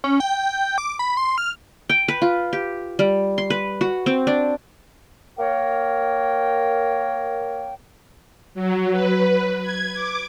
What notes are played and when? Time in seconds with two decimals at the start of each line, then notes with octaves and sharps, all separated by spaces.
0.04 C#4
0.20 G5
0.78 D6
0.99 B5
1.17 C6
1.38 F6
1.90 G5
2.08 B4
2.22 F4
2.53 G4
2.99 G3
3.38 C6
3.50 B4
3.81 F#4
4.06 C4
4.27 D4
5.38 A#3 A#4 C#5 G5
8.55 F#3
8.92 B4
9.62 G#6
9.93 D6